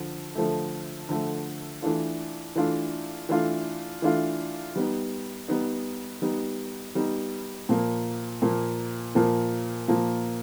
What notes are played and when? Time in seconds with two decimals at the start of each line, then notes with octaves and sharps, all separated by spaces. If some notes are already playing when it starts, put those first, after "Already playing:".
Already playing: D3 F3
0.35 D3 F3 A3
1.09 D3 F3 A3
1.82 E3 A3 D4 F4
2.56 E3 A3 D4 F4
3.29 E3 A3 D4 F4
4.02 E3 A3 D4 F4
4.76 G3 B3 D#4
5.48 G3 B3 D#4
6.22 G3 B3 D#4
6.95 G3 B3 D#4
7.69 A#2 F3 A#3
8.42 A#2 F3 A#3
9.15 A#2 F3 A#3
9.88 A#2 F3 A#3